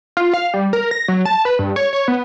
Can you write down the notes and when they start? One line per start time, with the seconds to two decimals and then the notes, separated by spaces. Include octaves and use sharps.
0.17 F4
0.34 F5
0.54 G3
0.73 A#4
0.91 A#6
1.08 F#3
1.25 A5
1.45 B4
1.59 G2
1.76 C#5
1.93 C#5
2.08 B3